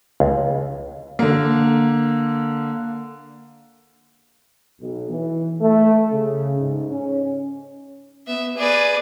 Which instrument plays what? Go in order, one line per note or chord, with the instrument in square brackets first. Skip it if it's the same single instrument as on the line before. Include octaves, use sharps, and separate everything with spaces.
[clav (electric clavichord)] C#2
[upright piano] D3 A#3
[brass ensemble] B1
E3
A3
C#3
G#2
C#4
[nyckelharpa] B3 [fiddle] E5
[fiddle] G#4 B4 [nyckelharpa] D5